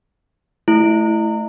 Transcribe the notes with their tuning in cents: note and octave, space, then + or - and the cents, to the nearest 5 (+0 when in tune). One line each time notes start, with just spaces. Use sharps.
A3 -15 E4 +0